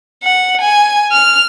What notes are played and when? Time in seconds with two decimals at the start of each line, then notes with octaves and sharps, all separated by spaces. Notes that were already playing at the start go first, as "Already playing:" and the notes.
0.23 F#5
0.61 G#5
1.12 F6